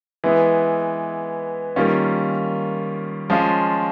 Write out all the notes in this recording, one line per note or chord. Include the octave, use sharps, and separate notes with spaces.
E3 G#3 B3 E4
D#3 G3 A#3 C#4 F4
F3 G#3 C#4 F4